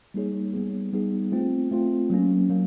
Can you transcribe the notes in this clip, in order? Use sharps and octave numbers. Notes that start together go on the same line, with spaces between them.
G3 A#3 D#4 G#4 C#5
G3 B3 D#4 G#4
G3 B3 D#4 G#4
A3 C4 F4
A3 C4 F4
F#3 A#3 C#4
F#3 A#3